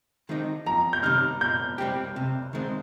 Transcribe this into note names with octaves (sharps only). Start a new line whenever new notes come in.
D#3 G#3 C4 D#4
F2 A#5
G6
C3 D#3 G3 F6
A#2 G6
G3 C4 G4
C3
D#3 G#3 C4